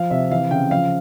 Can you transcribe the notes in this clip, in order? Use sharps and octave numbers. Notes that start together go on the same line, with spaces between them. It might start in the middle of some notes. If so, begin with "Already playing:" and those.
Already playing: F3 F5
C3 E5
E3 F5
C#3 G5
F3 F5